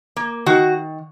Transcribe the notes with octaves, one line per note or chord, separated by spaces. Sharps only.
A#3
D#3 F#4